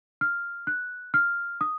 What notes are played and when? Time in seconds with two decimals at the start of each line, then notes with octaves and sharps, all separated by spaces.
0.21 F6
0.67 F#6
1.14 F6
1.61 D#6